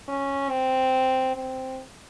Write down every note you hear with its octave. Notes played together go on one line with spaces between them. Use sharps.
C#4
C4
C4